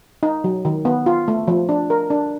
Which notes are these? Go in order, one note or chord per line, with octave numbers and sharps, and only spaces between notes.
D#4
F#3
D#3
B3
F4
A3
F3
D4
A#4
D4